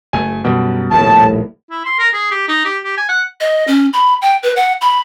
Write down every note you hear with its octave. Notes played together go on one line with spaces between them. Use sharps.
F#1 A3 G#5
F#2 B2 D3 G3
D#1 A#1 D#2 A2 A5
E4
C6
A#4
G#4
G4
D#4
G4
G4
G#5
F#5
D#5
C#4
B5
G5
B4
F#5
B5